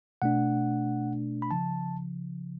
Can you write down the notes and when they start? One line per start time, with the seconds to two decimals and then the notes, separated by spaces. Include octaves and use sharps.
0.22 B2 A3 D4 F#5
1.42 B5
1.51 C#3 F3 A5